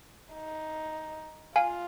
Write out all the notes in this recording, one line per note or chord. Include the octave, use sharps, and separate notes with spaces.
D#4
F4 F5 G#5